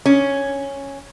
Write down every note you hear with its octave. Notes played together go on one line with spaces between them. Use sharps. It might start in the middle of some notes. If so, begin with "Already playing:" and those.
C#4